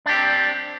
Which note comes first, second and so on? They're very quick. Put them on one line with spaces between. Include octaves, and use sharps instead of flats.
D4 G4 C4